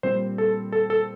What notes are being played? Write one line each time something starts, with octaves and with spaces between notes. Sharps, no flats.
A#2 G3 C4 C5
A4
A4
A4